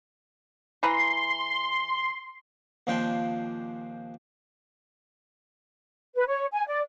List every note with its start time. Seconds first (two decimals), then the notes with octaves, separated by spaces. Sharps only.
0.83 E3 B4 A#5 C6
2.87 D#2 A#2 F3 C4 D4 G5
6.15 B4
6.28 C#5
6.52 G#5
6.67 D5